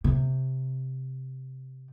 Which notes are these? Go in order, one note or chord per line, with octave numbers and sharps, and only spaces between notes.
C3